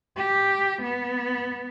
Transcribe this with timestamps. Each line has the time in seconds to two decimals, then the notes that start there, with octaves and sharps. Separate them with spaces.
0.17 G4
0.82 B3